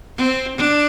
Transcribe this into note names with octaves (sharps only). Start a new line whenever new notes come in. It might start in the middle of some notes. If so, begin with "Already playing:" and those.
C4
D4